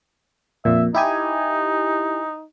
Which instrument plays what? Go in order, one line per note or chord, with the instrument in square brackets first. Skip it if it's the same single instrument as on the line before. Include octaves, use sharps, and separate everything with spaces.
[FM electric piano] F2 A#2 [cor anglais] E5
[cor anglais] D#4 [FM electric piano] E4 G4 G#5